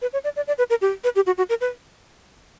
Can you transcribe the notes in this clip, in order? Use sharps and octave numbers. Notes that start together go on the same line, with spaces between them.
B4
C#5
D5
D5
D5
B4
A#4
G4
B4
G4
F#4
F#4
A#4
B4